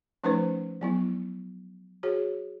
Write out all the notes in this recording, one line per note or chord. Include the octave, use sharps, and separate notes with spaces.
F3 A3 C#4 D#4 B4 C5
F#3 B3 E4
F#4 G#4 C#5